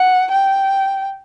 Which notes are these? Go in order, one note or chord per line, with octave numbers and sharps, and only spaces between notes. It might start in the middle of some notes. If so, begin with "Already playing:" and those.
Already playing: F#5
G5